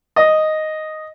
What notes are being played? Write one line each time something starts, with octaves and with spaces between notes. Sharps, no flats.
D#5